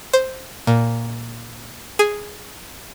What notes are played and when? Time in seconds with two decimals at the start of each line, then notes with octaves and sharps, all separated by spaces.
0.13 C5
0.67 A#2
1.99 G#4